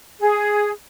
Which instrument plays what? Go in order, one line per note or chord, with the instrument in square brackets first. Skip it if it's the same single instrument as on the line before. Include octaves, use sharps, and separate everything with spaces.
[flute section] G#4